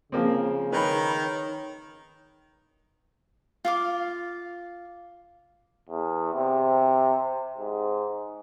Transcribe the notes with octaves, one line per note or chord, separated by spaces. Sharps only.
C#3 F3 A#3 C4
D#3 B4 C#5 B5
F4 F5 D6
E2
C3
G#2